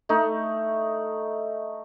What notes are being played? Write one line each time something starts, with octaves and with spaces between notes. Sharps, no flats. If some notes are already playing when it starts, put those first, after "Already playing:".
A3 D#4